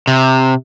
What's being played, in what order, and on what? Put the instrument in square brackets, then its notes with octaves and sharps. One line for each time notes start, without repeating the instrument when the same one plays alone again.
[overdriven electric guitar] C3